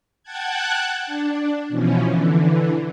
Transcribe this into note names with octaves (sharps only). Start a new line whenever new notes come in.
F#5 G5 A5 F#6 G#6
D4
B2 E3 F3 C#4
D3 E3